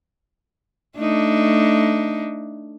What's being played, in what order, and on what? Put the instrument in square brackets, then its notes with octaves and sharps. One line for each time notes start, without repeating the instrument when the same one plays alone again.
[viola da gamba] A3 D4 D#4